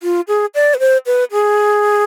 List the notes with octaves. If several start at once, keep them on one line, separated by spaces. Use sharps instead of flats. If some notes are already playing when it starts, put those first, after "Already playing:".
F4
G#4
D5
B4
C5
B4
G#4